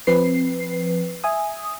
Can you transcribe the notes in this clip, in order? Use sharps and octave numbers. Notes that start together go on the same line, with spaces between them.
F3 C4 B4 C7
E5 G#5 D#6